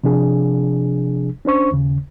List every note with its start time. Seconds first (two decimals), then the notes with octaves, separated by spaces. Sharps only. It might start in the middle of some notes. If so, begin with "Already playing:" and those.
0.04 C3 F3 D4 G#4
1.45 C#4 D4 C5 C#6
1.72 D#2 C#3